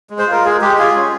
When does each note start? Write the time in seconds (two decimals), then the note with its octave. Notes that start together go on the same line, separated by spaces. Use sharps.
0.10 G#3
0.18 C5
0.27 F4 A#4
0.44 G#3 G#4
0.61 G#3 G4
0.78 F4 G#4
0.95 C#4